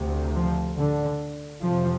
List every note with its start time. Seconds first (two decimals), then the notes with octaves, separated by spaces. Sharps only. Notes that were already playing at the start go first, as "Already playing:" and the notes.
Already playing: D2 C3
0.35 F3
0.77 D3
1.63 F2 C3 F3